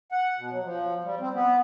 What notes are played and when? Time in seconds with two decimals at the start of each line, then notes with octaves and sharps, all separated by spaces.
0.12 F#5
0.38 B2
0.51 F#3
0.64 F3
1.04 G3
1.20 C4
1.34 B3